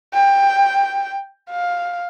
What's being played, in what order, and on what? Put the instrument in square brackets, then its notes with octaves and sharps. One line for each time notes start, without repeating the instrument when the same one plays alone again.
[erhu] G5
F5